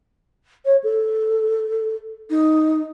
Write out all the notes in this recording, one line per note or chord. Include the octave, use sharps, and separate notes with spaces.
C#5
A4
D#4